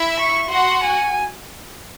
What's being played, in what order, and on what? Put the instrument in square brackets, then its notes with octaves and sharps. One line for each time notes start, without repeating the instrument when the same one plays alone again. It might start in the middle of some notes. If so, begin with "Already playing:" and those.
Already playing: [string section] E4 E5
[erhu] C#6
[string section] F#4 F#5 [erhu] C6
[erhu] G#5